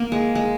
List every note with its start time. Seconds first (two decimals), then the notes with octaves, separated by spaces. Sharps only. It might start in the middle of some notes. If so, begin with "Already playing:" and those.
Already playing: A#3
0.12 G#3
0.35 G#3